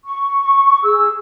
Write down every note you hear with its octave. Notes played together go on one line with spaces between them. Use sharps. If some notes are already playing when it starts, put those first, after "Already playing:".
C#6
G#4 E6